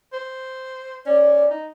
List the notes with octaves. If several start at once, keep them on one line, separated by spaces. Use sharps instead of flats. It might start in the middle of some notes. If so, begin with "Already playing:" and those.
C5
C#4 D5
D#4